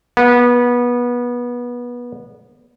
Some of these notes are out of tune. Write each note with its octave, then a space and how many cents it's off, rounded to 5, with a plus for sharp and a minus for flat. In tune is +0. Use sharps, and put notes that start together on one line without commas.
B3 -25